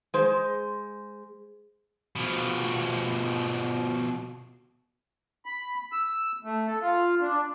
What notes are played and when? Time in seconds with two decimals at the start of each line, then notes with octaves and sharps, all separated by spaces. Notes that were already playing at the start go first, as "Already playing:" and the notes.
0.14 G#3 C5
2.16 B2 F3
5.46 B5
5.92 E6
6.44 A3
6.67 A4
6.82 F4
7.21 D4